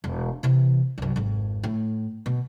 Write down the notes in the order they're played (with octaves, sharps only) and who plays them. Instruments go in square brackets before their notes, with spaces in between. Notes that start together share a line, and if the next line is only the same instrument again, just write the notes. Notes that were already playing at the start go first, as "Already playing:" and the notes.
[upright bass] E1
C3 E3
C2 F#2
G#1 F2
A2
B2